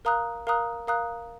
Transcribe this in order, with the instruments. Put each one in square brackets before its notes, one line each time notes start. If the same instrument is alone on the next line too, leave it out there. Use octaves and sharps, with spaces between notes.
[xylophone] A#4 F5 A#5 D#6 F#6
A#4 F5 A#5 D#6 F#6
A#4 F5 A#5 D#6 F#6